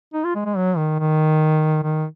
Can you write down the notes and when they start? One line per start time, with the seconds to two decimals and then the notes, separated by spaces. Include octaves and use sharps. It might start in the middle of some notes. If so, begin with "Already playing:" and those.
0.14 D#4
0.24 F4
0.35 G#3
0.46 G#3
0.57 F#3
0.77 D#3
1.00 D#3
1.83 D#3